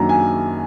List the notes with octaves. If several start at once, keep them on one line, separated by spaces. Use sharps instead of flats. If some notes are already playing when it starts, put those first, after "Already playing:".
Already playing: F#2 D#3 F#3 A#3 D4 A#5
G#5